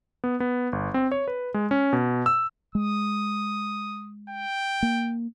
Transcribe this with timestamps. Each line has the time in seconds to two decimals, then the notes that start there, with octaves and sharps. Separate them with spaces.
0.24 B3
0.40 B3
0.73 G1
0.94 C4
1.12 C#5
1.28 B4
1.54 G#3
1.71 C#4
1.93 B2
2.26 E6
2.75 G#3 D#6
4.30 G5
4.83 A#3